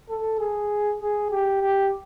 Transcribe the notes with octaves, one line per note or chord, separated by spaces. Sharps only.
A4
G#4
G#4
G4
G4